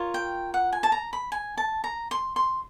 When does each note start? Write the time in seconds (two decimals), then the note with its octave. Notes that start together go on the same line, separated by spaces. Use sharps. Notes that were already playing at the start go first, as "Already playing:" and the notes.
Already playing: F4 A#4 C#5
0.14 G5
0.54 F#5
0.73 G#5
0.83 A5
0.92 A#5
1.13 B5
1.32 G#5
1.57 A5
1.84 A#5
2.11 C6
2.36 C6